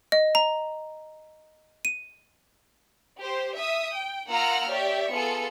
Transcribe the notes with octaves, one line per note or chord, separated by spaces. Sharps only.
D#5
A#5
D#7
G4 C5
E5 D#6
G5
A#3 F4 F#5 A#5 E6 F6
G4 C#5 D5 E5
B3 F4 G#4 A4 C#7